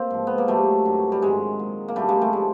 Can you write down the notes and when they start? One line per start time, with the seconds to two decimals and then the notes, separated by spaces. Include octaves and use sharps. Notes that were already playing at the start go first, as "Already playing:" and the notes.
Already playing: A#3 C4
0.11 G#2 F3
0.27 B3
0.38 A#3
0.48 A#2 F#3 G3 A3
0.85 G2 D#3 F#3
1.12 G3
1.22 G#2 D#3 F#3 G#3
1.59 A#2 F#3
1.88 A#3
1.96 F#2 D3 F#3 G3 A3
2.08 G#3 A#3
2.22 G3 A3
2.33 F3 G#3